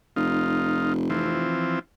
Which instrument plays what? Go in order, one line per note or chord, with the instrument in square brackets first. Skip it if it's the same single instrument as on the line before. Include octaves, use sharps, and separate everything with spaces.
[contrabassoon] F1 [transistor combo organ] D#4 F4
[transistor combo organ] E3 F3 C4